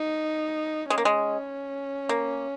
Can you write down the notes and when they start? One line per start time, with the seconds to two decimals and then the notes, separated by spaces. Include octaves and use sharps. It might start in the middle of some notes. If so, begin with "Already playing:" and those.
Already playing: D#4
0.90 G#3 C#4
0.98 A#3
1.05 G#3
2.09 A#3